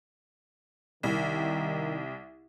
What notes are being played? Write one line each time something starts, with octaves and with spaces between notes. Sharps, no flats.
C2 D#3